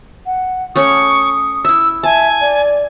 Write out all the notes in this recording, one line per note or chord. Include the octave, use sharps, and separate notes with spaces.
F#5
A3 C#4 C#6 D#6
E4 E5 E6
E5 G#5 A5
D5